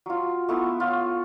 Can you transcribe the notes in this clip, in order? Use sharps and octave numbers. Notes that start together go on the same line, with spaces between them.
F#3 F4
A3 B3 E4
F4 C#5